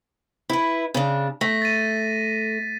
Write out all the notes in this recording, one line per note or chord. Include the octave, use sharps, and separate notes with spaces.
E4 B4
C#3 D4
A3 A#6 B6
A6 D#7